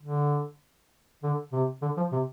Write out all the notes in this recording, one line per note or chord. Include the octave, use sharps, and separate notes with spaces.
D3
D3
C3
D3
F3
C3